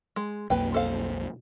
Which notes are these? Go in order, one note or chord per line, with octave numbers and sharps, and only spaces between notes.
G#3
B1 F2 A#3 B4 G5
A4 C5 F5